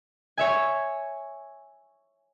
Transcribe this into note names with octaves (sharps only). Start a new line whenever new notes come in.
C#5 E5 G#5